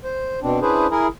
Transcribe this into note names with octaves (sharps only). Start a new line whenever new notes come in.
C5
B2 C4 D4
C#4 D4 E4 G#4 B4 C5
E4 G#4 A#4